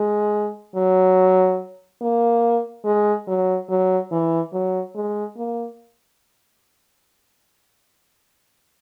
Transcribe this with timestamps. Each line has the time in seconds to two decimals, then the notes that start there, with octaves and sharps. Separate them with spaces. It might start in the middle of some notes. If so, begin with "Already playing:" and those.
Already playing: G#3
0.75 F#3
2.02 A#3
2.85 G#3
3.28 F#3
3.69 F#3
4.12 E3
4.53 F#3
4.95 G#3
5.37 A#3